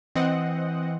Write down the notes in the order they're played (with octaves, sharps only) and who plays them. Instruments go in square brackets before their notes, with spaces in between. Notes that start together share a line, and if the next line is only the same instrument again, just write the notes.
[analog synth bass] E3 [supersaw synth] C4 D#5 F#5